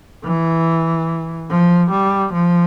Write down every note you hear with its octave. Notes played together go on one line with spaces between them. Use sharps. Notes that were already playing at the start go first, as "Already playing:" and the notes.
E3
F3
G3
F3